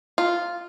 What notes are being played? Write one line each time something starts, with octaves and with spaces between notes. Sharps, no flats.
F4